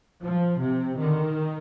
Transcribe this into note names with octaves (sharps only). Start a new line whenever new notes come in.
F3
C3
D#3